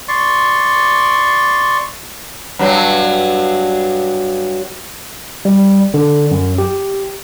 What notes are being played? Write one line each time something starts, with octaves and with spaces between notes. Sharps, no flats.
D5 C6 C#6
G2 F#3
G3
D3
F#2
G4